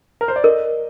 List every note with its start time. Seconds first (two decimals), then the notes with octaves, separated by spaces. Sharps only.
0.21 A#4
0.28 C5
0.36 D5
0.44 A#4 D#5